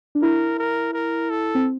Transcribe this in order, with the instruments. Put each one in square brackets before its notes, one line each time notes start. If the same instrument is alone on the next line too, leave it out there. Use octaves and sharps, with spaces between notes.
[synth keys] D4
[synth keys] E4 [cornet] A#4
[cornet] A#4
A#4
A4
[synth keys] C4